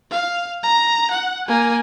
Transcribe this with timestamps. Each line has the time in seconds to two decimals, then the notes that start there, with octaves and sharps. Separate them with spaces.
0.10 F5
0.63 A#5
1.11 F#5
1.48 A#3 G#5